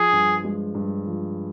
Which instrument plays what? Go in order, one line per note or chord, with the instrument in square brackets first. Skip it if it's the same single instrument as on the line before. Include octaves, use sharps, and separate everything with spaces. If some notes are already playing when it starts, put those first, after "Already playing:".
Already playing: [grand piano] F3 [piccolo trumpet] G#4
[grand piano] G2
G#3
G2
F3